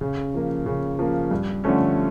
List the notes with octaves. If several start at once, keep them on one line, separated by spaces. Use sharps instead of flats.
C#3
F3 A#3
C#3
F3 A#3
G2
D3 F3 A3 C#4